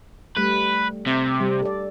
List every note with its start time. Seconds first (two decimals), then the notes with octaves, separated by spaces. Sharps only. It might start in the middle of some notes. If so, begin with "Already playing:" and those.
0.37 G3 A3 B4
1.07 C3
1.40 G3
1.62 A4 D5